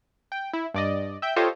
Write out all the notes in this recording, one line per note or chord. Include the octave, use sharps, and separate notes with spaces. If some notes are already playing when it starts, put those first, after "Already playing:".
G5
E4
G2 D5 D#5
E5 G5 G6
F4 G4 A4 C5 C#5 D#5